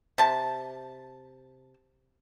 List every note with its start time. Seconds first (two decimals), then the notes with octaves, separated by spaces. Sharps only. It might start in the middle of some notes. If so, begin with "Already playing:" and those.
0.18 C3 A5